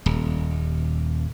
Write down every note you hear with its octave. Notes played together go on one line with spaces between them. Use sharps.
D#1